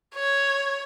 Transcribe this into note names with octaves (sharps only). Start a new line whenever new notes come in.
C#5